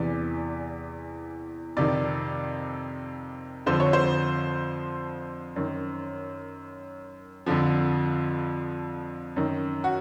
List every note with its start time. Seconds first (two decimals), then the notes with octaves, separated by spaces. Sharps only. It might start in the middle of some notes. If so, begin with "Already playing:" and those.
Already playing: E2 C3 E3 D5
1.77 F2 C3 D#3 D5
3.66 F2 D3 F3 C5
3.80 C#5
3.93 C5
5.56 F#2 D#3
7.46 F2 D3 F3
9.36 F#2 D#3
9.84 F#4